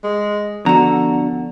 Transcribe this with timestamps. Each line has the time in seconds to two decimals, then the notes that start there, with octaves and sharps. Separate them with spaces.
0.04 G#3
0.66 D3 F3 B3 F#4 A4 A#5